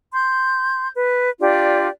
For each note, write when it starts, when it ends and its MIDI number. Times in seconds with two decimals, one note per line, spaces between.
0.12 0.88 84
0.12 0.88 91
0.93 1.28 71
1.39 1.87 62
1.39 1.87 65
1.39 1.87 67
1.39 1.87 74